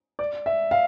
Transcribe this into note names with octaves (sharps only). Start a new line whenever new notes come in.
D5
E5
F5